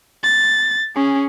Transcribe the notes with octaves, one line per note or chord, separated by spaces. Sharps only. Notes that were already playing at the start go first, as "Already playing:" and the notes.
A6
C#4 G#4